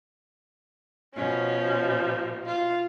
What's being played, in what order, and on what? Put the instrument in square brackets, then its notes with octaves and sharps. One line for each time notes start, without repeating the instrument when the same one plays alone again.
[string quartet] B2 F3 [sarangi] C#4
[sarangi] F4